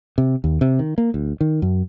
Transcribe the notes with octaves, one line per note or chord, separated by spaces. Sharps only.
C3
D#2
C3
D#3
A#3
D2
D#3
F#2